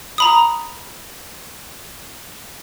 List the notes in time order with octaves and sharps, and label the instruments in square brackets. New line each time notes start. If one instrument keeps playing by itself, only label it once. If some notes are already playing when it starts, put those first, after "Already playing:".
[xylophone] A#5 B5 D#6